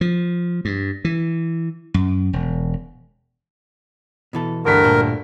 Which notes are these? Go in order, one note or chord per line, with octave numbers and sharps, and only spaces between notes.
F3
G2
E3
F#2
E1
B2 E3 A4
D2 G2 A#4 B6
A#2 A3 A4